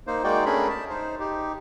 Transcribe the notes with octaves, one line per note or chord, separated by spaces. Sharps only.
A#3 D#4 C5
G#3 A#3 D#4 F#4 D5 G5
A3 C#4 D4 G#4 A#4 B5
A5
D#4 C5
D#4 G4